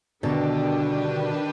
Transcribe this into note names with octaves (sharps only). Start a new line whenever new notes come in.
B2 D3 D#3 G3 D4 G4 B4